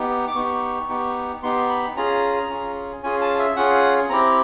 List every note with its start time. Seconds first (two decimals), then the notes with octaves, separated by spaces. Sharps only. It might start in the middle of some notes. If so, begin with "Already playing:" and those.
Already playing: B3 D#4 G4
0.28 D6
0.35 B3 D#4 G4 C#6
0.89 B3 D#4 G4
1.43 B3 D#4 G4 C6
1.69 B5
1.96 C#4 F4 G#4 A#5
2.50 C#4 F4 G#4
3.03 C#4 F4 G#4 G#5
3.21 A5
3.39 E5
3.56 C#4 F4 G#4 F#5
4.10 C4 E4 G4 A#5